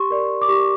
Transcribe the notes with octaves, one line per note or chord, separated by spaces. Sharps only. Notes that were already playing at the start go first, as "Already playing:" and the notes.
Already playing: G4 C6 C#6
A#4 D5
D6
G4 C#6